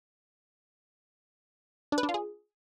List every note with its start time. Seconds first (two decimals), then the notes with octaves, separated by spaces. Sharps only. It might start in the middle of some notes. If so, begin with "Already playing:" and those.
1.92 D4
1.98 B4
2.03 D4
2.09 F4
2.14 G#4